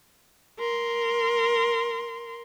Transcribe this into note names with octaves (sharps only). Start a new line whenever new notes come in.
A#4 C6